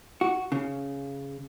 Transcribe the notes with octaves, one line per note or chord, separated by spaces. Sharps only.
F#4
C#3